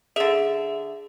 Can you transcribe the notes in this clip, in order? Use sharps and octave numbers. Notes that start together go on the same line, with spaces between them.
D3 G#4 E5